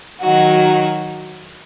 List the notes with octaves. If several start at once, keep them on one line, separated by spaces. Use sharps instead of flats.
D#3 F#3 D#4 F#4